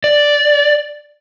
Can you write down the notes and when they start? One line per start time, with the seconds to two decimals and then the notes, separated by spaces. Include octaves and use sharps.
0.04 D5